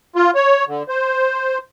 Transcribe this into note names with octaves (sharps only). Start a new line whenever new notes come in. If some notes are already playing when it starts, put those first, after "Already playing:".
F4
C#5
D3
C5